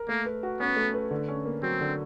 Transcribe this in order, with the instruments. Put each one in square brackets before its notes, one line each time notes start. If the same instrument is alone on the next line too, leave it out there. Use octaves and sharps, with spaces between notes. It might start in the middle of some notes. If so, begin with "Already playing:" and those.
Already playing: [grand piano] A#4
[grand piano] A3 [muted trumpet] A#3
[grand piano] B4
F#4
[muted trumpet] B3 [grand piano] C#4
[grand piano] A3
B4
D3
C#4
A#3
[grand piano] F#3 [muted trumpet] C4
[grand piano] D3